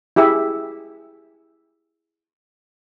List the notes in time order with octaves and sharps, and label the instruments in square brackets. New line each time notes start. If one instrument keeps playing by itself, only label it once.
[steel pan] E4 G4 G#4 E5